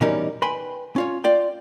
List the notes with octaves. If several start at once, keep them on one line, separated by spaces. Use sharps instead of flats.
B2 E3 G3 C#4 D#4 A#4
B4 G5 G#5 B5 C6
C#4 F4 C#5
F4 D5 G5